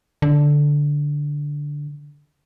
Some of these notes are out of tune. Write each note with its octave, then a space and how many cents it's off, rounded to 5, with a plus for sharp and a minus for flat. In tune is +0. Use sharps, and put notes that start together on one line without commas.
D3 -5